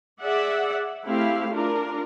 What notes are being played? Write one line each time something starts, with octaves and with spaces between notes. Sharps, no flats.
G#4 D5 E5 F#5
A3 C4 E4 G4 F5
D4 F4 A#4